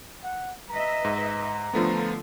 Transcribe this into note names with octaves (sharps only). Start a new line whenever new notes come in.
F#5
B4 D#5 E5 A#5
G#2
D3 F3 A3 B3 F4